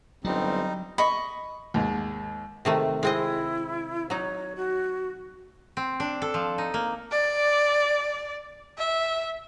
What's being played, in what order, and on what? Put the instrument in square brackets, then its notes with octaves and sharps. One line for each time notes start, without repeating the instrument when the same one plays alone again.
[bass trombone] G1 [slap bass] F#3 [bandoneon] G3 D#4 [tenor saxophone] C4
[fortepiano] D#5 [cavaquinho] B5 C#6
[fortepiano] D#2 G#2
[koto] C3 D#3 A3
[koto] G#3 C4 D#5 [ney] E4
[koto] F#3 D#4 [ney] C#5
[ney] F#4
[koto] C4
D4
A4
F3
D#4
A#3
[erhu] D5
E5